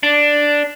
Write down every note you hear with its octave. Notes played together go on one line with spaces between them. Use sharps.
D4